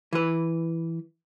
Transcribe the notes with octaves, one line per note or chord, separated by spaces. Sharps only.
E3 B4